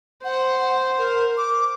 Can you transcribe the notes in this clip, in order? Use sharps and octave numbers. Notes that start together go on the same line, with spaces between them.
C5 F#5
A#4
D6